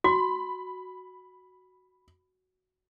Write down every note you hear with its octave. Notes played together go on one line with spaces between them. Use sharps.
F#4 B5